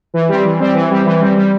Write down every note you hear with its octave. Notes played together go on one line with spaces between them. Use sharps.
E3
G3 C4
E3
G3 C4
E3
G3 C4
E3
G3 C4
G3